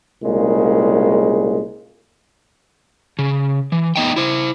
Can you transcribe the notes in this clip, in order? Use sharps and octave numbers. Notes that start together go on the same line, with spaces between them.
C2 A#2 C#3 G#3
C#3
E3
B3 D#4 G5
E4 C5